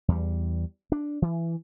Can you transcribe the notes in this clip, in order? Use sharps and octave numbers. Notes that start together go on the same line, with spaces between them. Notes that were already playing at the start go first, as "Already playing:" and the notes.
E2 G3
D4
E3